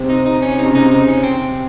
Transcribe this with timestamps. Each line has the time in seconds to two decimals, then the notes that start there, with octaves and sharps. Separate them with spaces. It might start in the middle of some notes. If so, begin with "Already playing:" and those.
Already playing: C3 C4
0.09 D#4
0.26 D#4
0.42 C#4
0.58 C3 C4 D#4
0.66 C#3 C#4
0.74 C3 C4 D#4
0.83 C#3
0.91 D#4
1.07 C#4
1.23 C3 C4